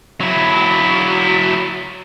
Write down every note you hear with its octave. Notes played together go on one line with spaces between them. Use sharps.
F#3 E4